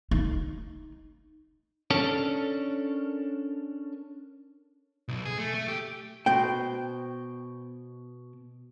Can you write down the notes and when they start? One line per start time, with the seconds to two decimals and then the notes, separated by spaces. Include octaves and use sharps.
0.11 D#4
1.90 C#4 D4 A4 A#4 C#5
5.08 B1
5.25 G#4
5.38 A3
5.54 A3
5.68 G4
6.26 B2 C5 G5